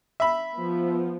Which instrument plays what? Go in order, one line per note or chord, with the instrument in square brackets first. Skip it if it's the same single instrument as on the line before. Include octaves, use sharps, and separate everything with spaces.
[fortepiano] E5 B5
[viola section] F3 B3